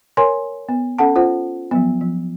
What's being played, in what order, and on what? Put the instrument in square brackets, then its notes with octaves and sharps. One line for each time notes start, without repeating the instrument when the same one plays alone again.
[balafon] A#4 C#5 G#5 C6
B3
C#4 A4 F#5 A5
F4 C5 F#5
F3 F#3 B3
F3